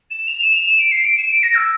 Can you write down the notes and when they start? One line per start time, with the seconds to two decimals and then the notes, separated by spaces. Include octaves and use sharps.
0.10 E7
0.27 F7
0.41 E7
0.53 F7
0.66 E7
0.79 D7
0.91 C7
1.05 D7
1.17 E7
1.30 D7
1.43 A#6
1.55 E6